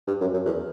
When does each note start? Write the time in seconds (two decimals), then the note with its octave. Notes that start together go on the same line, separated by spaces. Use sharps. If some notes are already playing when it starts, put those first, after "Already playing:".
0.07 G2
0.21 F#2
0.33 F#2
0.45 E2